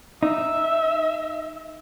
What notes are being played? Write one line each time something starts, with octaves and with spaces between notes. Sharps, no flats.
D#4 E5